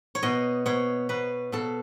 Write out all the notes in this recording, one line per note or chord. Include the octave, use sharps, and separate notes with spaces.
C#5
B2 D#5
B2 C#5
B2 B4
B2 A4